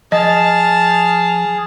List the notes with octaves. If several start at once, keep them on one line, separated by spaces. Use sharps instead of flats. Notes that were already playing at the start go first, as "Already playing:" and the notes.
F3 G#4 D#5 A5 F6